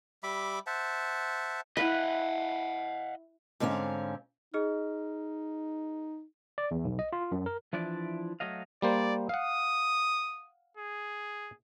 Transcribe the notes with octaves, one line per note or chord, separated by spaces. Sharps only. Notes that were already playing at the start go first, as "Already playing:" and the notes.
G3 E5 B5 D6
C5 E5 F#5 A5
E4 B4 D#5 F5 F#5
G#2 D3 C4 C#4 F5
D#4 G#4 D#5 F6
D5
E2
B1
D#5
F4
F#2
A#4
E3 F3 D4 E4 D5
F#3 A3 D#5 F5
G3 A#3 C5 D5
F5 F#5 D#6
G#4